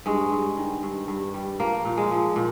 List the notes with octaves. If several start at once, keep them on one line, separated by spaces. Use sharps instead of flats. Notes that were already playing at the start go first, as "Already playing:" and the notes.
G2 G#3
G2
D#3
G2
G2
G3
F3 A#3
A#2
G#3
F3
A#2